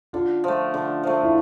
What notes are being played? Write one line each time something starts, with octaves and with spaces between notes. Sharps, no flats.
D3 F4
F3 A3
D3
F3 A3
E4